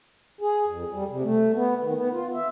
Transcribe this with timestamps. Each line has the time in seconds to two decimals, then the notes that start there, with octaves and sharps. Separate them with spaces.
0.41 G#4
0.68 F2
0.92 G3
1.10 C3
1.23 A3
1.54 B3
1.81 D#3
1.95 B3
2.13 F4
2.35 E5